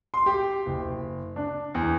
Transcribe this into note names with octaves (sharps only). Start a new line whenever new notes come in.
C6
G4
F#1
D4
E2